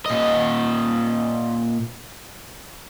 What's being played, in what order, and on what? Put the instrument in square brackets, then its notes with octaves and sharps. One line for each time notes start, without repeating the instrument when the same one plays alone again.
[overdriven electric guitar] A#2 D#5